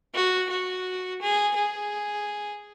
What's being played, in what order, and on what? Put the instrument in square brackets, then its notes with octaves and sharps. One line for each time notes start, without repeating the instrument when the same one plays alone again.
[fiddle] F#4
F#4
G#4
G#4